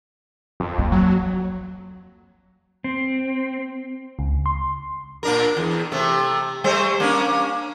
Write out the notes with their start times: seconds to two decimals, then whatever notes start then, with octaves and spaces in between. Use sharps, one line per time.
0.60 F2
0.78 A#3
0.92 F#3
2.84 C4
4.19 C#2
4.46 C6
5.23 A#2 D4 A#4
5.57 E2
5.92 C3 A3
6.64 G3 A3 C5
7.00 A#3 C#4 D4